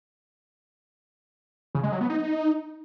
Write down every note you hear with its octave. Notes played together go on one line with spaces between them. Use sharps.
C#3
G#3
F#3
B3
D#4